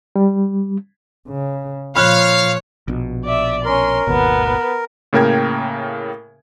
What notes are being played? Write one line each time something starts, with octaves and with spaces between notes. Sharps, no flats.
G3
C#3
A#2 F3 C#5 F5 B5 F6 F#6
A#1 B2
D5 E5
C#4 A#4 C6
G#1 D#2 B2 B3 B4
A2 C#3 A#3 A#4 G5 G#6